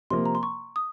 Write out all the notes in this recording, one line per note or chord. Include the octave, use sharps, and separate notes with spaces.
C3 F3 A#3 C6
A#5
C6
C#6
D#6